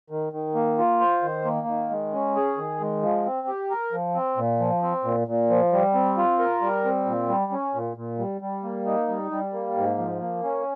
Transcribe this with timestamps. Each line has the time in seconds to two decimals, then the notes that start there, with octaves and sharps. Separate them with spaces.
0.10 D#3
0.33 D#3
0.55 A#3
0.78 F4
1.00 C5
1.22 D#3
1.45 A#3
1.67 D#3
1.90 G#3
2.13 C#4
2.36 G#4
2.57 D#3
2.81 G#3
3.02 F3
3.25 C4
3.47 G4
3.70 A#4
3.92 F3
4.15 C4
4.37 A#2
4.60 F3
4.82 C4
5.04 A#2
5.28 A#2
5.50 F3
5.72 G3
5.94 C4
6.17 F4
6.39 A#4
6.61 G3
6.85 C4
7.06 A#2
7.28 G3
7.52 C#4
7.74 A#2
7.97 A#2
8.19 G3
8.41 G3
8.64 A#3
8.86 D#4
9.09 G3
9.31 G3
9.53 A#3
9.77 G#2
9.98 F3
10.21 A#3
10.44 C#4